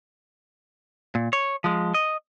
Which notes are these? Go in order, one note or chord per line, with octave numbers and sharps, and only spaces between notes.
A#2
C#5
F3 G#3
D#5